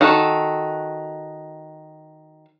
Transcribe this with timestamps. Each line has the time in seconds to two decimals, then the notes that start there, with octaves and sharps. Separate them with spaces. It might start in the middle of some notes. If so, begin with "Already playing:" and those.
0.01 D#3 F#4 A4